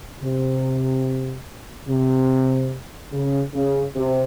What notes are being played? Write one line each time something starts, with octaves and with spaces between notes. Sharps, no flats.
C3
C3
C#3
C#3
C3